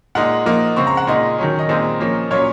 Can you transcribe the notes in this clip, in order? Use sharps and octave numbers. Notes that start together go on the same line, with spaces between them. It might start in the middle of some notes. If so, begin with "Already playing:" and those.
A#2 G#3 D#4 F#5
F3 A#3 D#4
C#3 G#3 C4 C#6
A#5
F#5
A#2 G#3 D#4 D#5
D#3 F#3 C#4
D#5
A#2 G#3 C4 D#4
F3 A#3 C#4
A#2 F#3 C#4 C#5